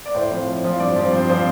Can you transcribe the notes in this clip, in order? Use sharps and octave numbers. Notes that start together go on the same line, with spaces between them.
D5
A2 C5
F3 C4
A2
F3 C4
G2 D5
F3 C4
G2 C5
F3 C4 C5